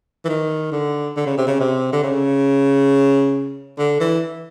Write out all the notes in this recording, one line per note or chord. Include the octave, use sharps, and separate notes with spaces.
E3
D#3
D3
D3
C#3
C3
C#3
C3
D3
C#3
D3
E3